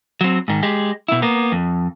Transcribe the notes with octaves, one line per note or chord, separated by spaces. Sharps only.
F#3 C4
G#2 D#3
G#3 G4
B2 E4
A#3 B3
F2